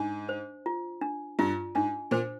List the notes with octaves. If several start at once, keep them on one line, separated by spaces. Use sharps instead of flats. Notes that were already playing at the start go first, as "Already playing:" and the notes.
Already playing: G#2 D4
C5
F4
D4
G2 F4
G#2 D4
A#2 C5